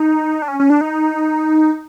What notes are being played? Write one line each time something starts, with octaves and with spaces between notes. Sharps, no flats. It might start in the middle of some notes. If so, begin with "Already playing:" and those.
Already playing: D#4
D4
C#4
C#4
D4
D#4